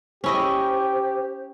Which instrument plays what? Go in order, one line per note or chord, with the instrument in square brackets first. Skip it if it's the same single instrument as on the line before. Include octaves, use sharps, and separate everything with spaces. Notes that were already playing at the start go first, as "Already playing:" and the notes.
[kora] C#4 E4 D#5 [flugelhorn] G4 [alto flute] C5